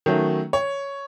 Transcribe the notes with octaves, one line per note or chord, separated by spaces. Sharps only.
D#3 F#3 A3 C#4
C#5